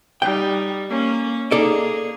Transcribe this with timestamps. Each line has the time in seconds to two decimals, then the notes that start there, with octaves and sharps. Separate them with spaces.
0.22 G3 D#4 G5
0.90 A#3 C#4
1.51 A#3 D#4 G#4 A4 D5